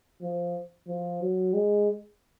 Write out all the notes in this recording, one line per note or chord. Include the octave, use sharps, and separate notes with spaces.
F3
F3
F#3
G#3